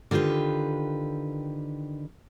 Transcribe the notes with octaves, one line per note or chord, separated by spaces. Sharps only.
D3 D#3 F4 G4 B4